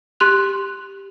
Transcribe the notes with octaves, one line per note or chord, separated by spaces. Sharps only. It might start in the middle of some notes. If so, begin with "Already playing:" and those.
G4 C6 F#6 F7